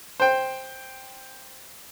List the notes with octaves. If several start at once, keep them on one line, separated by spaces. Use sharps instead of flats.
C5 G5